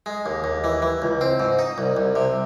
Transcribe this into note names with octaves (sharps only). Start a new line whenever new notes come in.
G#3
D#2
D#2
E3
E3
C#2
C4
G#2
D#4
C2
C2
C3